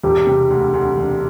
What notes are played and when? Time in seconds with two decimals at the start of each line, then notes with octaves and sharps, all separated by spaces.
0.04 E1 G4
0.27 C3
0.50 D2
0.74 D2
0.97 E1